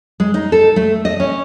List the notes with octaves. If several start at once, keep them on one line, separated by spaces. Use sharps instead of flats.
G#3
D#4
A4
A3
D#5
C#4